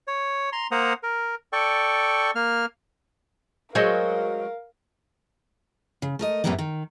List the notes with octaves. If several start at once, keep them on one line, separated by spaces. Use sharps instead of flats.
C#5
A#5 C6
A#3 C5 F#5 A#5 D#6
A#4
A4 D5 G5 C#6
A#3 F6
F#3 G#3 A#4 C5 C#5 D#5 F5
C#3
A3 A#4 D#5
F#2 A2 C3 G3 A#3 B3
D#3